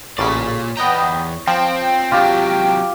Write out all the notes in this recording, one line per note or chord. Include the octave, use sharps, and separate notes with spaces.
A1 A#2 C#3 C#5 D5 B6
E2 B3 D#5 G5 A#5
F3 C4 G5
C3 F#3 F4 G4